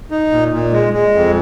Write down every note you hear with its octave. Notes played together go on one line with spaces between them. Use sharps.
D#4
A#2
A#2
G#3
G#3
F2